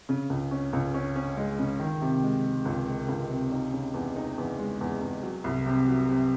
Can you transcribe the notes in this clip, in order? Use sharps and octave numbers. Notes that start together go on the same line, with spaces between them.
C#3
C#2
C#4
C#2
C#4
C#4
G#3
C#3
D#3
C3
G#3
G#3
C#2
G#3
C#2
C3
D#4
C#3
E2
D#4
E2
G#3
E2
E2
F#3
C2
C3
F#3
C3